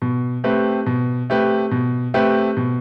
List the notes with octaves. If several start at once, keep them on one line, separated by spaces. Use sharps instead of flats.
B2
A3 C4 G4 B4
B2
A3 C4 G4 B4
B2
A3 C4 G4 B4
B2